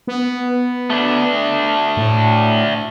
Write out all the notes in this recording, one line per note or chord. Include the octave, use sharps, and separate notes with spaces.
B3
A3 D4
A2